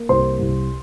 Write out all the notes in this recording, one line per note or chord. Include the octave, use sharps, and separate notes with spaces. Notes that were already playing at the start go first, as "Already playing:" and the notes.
Already playing: A#3
C2 C5 C6
C2